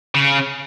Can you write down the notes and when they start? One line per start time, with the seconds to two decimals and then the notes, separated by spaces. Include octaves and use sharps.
0.15 C#3